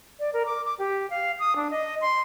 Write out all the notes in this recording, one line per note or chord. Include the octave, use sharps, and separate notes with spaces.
D5
A#4
D6
D6
G4
F5
D#6
D4
D#5
C6